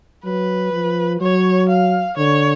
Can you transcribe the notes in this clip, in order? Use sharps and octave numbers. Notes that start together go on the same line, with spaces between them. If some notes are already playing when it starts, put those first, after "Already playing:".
F#3 B4
F3
F#3 C#5
F5
D3 C#5